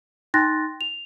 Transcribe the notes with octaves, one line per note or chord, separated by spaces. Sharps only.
D#4 G5 C6 F#6 A6 A#6
F7